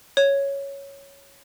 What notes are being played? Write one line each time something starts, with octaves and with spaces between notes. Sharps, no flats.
C#5